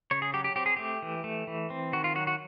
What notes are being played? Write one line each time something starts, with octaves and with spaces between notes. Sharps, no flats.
C#3 C#5
G#4
F#3 G4
G4
C4 G4
G#4
A3 G4
E3
A3
E3
C4
D#3 F#4
F4
F#3 F#4
F#4